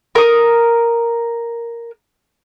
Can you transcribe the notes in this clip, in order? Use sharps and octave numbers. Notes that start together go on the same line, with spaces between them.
A#4 D#6